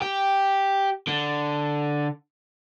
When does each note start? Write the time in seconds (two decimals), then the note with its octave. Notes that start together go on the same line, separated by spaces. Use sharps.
0.02 G4
1.08 D3